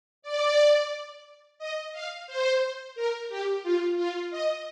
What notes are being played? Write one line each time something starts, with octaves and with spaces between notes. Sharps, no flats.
D5
D#5
F5
C5
A#4
G4
F4
F4
D#5